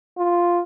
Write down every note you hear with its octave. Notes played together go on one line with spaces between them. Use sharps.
F4